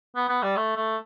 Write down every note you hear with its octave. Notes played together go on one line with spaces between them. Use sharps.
B3
B3
G3
A3
A3